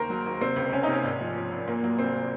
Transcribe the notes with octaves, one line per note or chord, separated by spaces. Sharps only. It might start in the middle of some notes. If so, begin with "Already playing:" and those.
Already playing: D#2 C#3 A#4 C5
F#3
D#2
C3 C4
C#2
C#2 C#4
C3 D#4
C#4
G#1
F3
F3
G#1
A#2 A#3
F#3 A#3
C2 C4
A#2